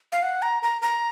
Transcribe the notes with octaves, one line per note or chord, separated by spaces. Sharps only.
F5
F#5
A#5
A#5
A#5